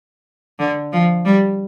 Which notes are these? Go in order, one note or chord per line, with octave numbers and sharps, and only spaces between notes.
D3
F3
G3